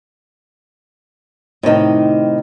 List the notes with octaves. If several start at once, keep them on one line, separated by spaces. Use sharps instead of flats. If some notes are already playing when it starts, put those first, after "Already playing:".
A2 C3 D#3 D#4